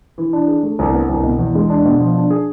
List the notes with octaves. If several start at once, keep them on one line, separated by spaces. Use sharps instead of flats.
E3
D4
G#4
A3
C2
B3
C2
B2
E2
G#3
D4
B2
F3
D4
G#4